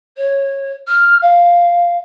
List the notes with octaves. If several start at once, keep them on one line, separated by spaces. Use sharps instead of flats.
C#5
F6
F5